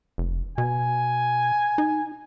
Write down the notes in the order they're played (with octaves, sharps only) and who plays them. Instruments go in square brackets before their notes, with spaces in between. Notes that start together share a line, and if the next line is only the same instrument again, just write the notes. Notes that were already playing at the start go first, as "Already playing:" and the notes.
[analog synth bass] F1
[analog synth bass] B2 [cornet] G#5
[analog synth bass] D#4